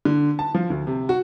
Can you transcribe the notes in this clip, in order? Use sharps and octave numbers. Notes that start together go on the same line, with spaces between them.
D3
A5
F3
D2
C3
F#4